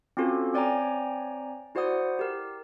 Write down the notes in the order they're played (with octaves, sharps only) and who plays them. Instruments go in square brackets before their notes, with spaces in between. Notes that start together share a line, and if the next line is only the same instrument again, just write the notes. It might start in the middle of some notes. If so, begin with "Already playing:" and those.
[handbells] C4 C#4 F4 F#4 A4
C4 C#5 D5 G5 G#5 A#5
E4 F#4 C5 D5 F#5 D#6
G4 A#4